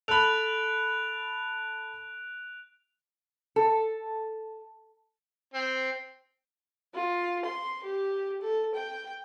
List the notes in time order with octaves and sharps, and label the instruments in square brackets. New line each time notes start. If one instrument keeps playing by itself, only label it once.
[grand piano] A4 B5 [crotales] F#6 D7 F7
[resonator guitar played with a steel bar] A4
[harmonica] C4
[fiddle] F4
C6
G4
A4
G5